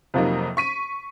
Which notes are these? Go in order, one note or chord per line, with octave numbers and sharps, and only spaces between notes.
F2 C3 F3 F#3 A#3 D#4
C#6 B6 D#7